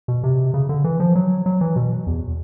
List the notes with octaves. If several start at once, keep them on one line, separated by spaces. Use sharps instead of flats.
B2
C3
C#3
D3
E3
F3
F#3
F#3
E3
B2
E2